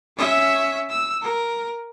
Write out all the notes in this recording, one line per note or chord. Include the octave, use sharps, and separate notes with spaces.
C#4 E5
E6
A#4